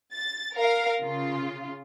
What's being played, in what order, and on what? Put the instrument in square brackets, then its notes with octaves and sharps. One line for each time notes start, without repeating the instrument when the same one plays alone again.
[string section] A6
A#4 F5
C#3 F4